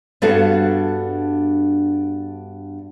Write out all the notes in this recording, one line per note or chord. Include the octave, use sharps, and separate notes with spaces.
G2 B3 D4 F#4 A4 F5